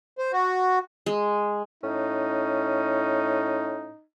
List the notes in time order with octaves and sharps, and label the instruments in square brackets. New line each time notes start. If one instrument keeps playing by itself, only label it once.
[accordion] C5
F#4
[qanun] G#3
[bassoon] A2 [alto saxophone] C#4 [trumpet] D#4